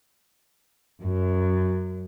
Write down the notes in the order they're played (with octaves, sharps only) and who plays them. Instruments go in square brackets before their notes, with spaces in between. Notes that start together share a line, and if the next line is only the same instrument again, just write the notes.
[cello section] F#2